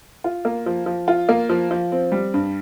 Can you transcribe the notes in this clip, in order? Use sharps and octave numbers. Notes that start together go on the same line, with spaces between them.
F4
A#3
F3
F3
F4
A#3
F3
F3
C4
G3
G2